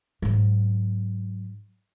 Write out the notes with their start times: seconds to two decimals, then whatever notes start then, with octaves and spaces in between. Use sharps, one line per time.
0.22 G#2 F#3